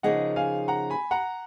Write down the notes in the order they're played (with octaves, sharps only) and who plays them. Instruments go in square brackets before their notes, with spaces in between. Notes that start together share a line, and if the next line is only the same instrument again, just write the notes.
[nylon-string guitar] C#3 F3 A#3 D#4 G#4 [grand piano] D#5 F#5
[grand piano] F5 G#5
F#5 A#5
G#5 B5
F#5 A#5